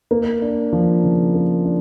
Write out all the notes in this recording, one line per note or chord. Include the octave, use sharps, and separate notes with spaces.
A#3
D4
F3
C#3
A#3
D4